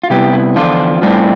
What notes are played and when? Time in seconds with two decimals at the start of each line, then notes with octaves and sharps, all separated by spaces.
0.04 F4
0.10 C3 G3 B3 E4 G4
0.33 E4
0.56 E2 D3 F3 D4 F4
1.02 A2 G3 C4 D4 F4